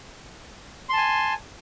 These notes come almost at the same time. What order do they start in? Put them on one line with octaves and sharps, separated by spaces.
C6 A5 G#5